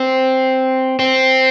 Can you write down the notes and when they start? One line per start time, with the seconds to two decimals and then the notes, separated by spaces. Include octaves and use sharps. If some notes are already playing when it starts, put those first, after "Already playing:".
Already playing: C4
0.99 C4